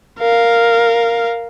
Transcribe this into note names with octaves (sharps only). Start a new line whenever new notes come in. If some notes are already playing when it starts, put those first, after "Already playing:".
A#4 F5